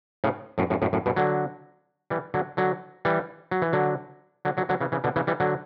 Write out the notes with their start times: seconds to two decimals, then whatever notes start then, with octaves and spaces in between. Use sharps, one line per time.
0.24 A2 C#3
0.58 F#2 A2
0.70 F#2 A2
0.82 F#2 A2
0.93 F#2 A2
1.06 G2 B2
1.16 D3 F#3
2.10 E3 G3
2.34 D3 F#3
2.57 D3 F#3
3.05 E3 G3
3.51 F#3
3.62 E3
3.73 D3 F#3
4.45 D3 F#3
4.57 D3 F#3
4.69 D3 F#3
4.81 C#3 E3
4.92 C#3 E3
5.04 B2 D3
5.16 C#3 E3
5.27 E3 G3
5.40 D3 F#3